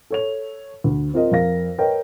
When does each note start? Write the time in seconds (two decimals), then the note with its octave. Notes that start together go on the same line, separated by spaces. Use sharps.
0.10 A4 C#5 F7
0.84 D2
1.14 C4 F4 A#4 D#5
1.31 F2 A#4 F5 A#6
1.78 A#4 B4 C#5 D#5 G5